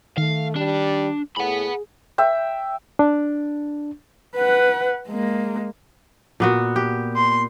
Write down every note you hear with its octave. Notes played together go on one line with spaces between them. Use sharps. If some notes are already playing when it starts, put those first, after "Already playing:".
D#3 A3 F5
G3 D4
A2 G#4 F#5 B5
E5 G5
D4
B4 F#5
G#3 A#3
A#2 B3 F#4
G4
C6